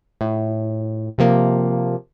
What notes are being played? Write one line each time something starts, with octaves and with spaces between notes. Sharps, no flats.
A2
C3 F3 A#3